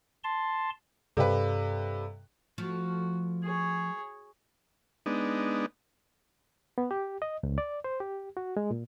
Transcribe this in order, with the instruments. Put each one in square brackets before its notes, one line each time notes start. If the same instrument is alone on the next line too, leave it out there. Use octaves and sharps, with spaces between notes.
[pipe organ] A5 C6
[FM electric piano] G2 [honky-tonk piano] C3 B4 [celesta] A4 D5 F5
[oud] F3 A3 [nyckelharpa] F#4
[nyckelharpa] G#4 C#5
[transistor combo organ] G#3 B3 D4 D#4
[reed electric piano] B3
G4
D#5
C#2
D5
C5
G4
F#4
G#3
A#2